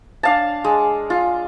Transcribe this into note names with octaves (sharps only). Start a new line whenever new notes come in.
D4 F5 A5
G#3
F4